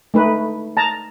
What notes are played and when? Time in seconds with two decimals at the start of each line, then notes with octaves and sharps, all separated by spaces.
0.14 A3 D#4 B4
0.77 A5 A#5